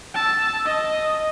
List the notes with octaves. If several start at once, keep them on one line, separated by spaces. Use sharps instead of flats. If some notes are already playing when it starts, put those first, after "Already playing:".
A5 E6
D#5